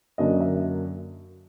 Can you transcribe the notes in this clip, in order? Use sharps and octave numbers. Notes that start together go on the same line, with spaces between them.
F#2 D3 F#3 A#3 D4 D#5
E5